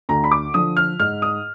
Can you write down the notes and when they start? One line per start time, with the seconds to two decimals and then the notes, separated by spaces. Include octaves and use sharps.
0.09 D2 A#5
0.24 B5
0.32 D6
0.54 D3 F3 D#6
0.77 F6
0.99 G#2 F6
1.22 D#6